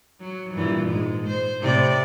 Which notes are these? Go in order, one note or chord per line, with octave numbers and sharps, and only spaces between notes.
F#3
G2 A#2 E3
G#2 G#3
C5
A2 C3 D5